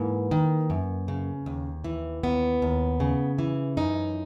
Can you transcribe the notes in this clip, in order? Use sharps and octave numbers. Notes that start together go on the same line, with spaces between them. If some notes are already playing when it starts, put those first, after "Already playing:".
Already playing: G#2 E3 A#3
D#3
F#2
C#3
D#2
E3
D#2 B3
D#2
C#3
E3
F#2 D#4